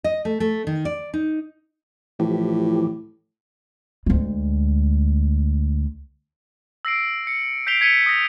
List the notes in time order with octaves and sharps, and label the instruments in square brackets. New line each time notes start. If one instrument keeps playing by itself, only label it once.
[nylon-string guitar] D#5
A3
A3
D#3
D5
D#4
[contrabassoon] A2 [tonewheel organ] E3 F3 G4
[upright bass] D2 G#3
[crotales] E6 A#6 C7 D7
C#7
G6 B6 C7 D7 F7 G7
G#6 B6 C#7 D#7 F7 G7
D#6 A#6